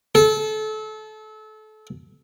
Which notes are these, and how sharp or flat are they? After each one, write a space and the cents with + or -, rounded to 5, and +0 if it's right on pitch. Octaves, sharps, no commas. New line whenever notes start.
A4 -30